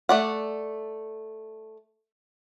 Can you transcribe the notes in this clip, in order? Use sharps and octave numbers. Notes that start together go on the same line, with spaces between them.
A3 D5 F#5